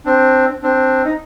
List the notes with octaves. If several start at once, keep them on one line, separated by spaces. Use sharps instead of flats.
C4 D4
C4 D4
D#4